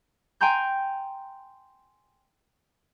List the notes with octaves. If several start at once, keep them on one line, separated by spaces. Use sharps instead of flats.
G5 G#5 A#5 C6 G6